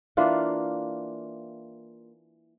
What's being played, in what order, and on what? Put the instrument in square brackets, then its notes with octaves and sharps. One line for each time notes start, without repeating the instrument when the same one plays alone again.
[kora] E3 A#3 D4 F4